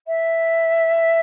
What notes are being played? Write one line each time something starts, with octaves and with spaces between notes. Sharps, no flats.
E5